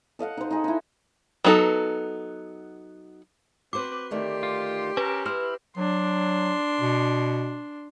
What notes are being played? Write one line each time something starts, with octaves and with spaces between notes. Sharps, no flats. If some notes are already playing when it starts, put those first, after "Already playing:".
A4 D#5 F5 F#5
D#4 C5
D#4 G#4
D#4 E4
F#3 B3 D#4 G#4 A4
C4 F#4 B4 C5 D6
D2 D#3 A3 G4 C6
F4
C#4 A#4 B4
E4 C5 F6
F#3 D4 C6
B2